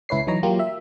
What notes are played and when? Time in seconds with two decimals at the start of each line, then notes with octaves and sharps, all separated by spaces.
0.09 C#2 E4 B4 C#5 C7
0.27 E3 F#3 D#4 C#5 A#5
0.43 F#3 A#3 F4 G4
0.59 E5